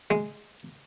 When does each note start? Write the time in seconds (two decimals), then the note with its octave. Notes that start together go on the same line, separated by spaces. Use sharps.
0.10 G#3